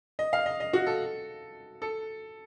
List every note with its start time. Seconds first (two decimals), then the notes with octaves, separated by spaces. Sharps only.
0.19 D#5
0.33 F5
0.46 D#5
0.60 D#5
0.73 F#4
0.87 A4
1.82 A4